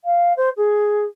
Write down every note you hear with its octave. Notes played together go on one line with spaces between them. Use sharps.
F5
C5
G#4